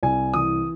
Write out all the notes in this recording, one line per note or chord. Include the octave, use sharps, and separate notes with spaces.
C2 G#5
E3 D#6